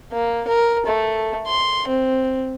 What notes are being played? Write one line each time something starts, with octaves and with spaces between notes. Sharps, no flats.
A#3
A#4
A3
C6
C4